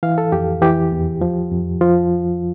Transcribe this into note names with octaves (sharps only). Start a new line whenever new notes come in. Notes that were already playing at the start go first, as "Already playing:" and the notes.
E3 F5
A4
F2 G4
E3 G4
E2
F3
F2
F3 F4